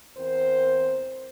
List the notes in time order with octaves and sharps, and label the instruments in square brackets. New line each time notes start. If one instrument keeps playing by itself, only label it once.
[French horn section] E2 C4 A#4 C5